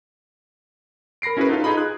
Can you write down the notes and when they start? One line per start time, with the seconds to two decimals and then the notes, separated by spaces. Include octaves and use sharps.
1.22 A#4 B5 A#6 C7 D7
1.37 C#4 E4 F#4 G#4 A#4 B4
1.49 D#4 F4 A4 B4 F5
1.64 D#4 F4 G#4 D#5 B5
1.77 G#4 F#6